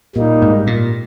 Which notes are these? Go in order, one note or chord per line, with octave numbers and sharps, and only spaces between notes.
A#2 G3 A#3 D#4
G#2
A#2